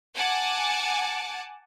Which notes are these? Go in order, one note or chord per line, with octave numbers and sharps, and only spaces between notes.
F#5 G#5 A5 D6